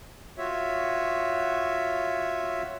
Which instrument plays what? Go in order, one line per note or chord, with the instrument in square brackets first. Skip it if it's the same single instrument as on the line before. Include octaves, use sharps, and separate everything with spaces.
[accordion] F4 F#4 C#5 E5